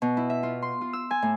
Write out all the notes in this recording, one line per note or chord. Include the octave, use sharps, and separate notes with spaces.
B2
E4
E5
F4
C6
F4
E6
G#5
A2